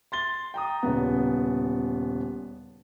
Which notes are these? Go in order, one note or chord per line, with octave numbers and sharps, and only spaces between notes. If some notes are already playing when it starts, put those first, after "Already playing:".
C6 A6 G7
G5 A#5 D#6
D#1 C#3 B3